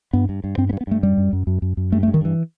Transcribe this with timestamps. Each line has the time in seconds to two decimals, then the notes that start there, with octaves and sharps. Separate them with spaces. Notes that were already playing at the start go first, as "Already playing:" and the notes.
0.13 G2 B3
0.29 G2
0.44 G2
0.57 G2 C4
0.69 B3
0.73 G2
0.81 B3
0.87 G2 A3
1.03 F#2 G3
1.17 F#2
1.33 F#2
1.47 F#2
1.62 F#2
1.77 F#2
1.92 G2 A3
2.03 A3
2.07 G2
2.14 D#3
2.21 G2 E3